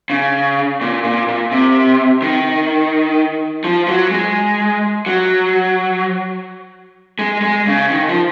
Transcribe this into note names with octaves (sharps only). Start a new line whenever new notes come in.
C#3
A#2
A#2
A#2
C3
D#3
F3
F#3
G#3
F#3
G#3
G#3
C#3
D#3
F3